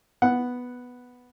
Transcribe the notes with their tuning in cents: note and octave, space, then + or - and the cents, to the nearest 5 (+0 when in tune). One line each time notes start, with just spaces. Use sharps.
B3 +0 F#5 +0